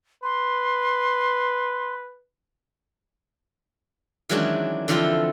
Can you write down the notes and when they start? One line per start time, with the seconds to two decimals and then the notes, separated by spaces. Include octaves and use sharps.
0.23 B4 C6
4.29 D#3 E3 F#3 G#3 C#4 D4
4.88 D3 E3 F3 C4 F4 A4